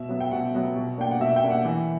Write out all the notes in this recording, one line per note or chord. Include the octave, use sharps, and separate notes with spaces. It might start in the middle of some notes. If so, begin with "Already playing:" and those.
Already playing: B2 E5
F#3 B3
G5
B2 F#5
F#3 B3
B2
A#3 D4 G5
F#5
B2 E5
G5
A#3 D4
F#5
E3